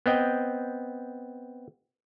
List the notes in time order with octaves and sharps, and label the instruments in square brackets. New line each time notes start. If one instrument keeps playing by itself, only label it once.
[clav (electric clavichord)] B3 C4 D#5 G5